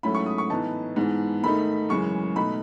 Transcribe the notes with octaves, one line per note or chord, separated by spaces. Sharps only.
G#2 F#3 A3 C#4 E4 B5
C#6
D#6
C#6
A2 E3 B3 D#4 A5
G#2 E3 B3
G#2 D#3 A3 D#4 B5
F#2 C#3 E3 G#3 C#6
B2 A3 D#4 B5